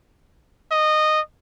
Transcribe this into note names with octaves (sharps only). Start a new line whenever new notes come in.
D#5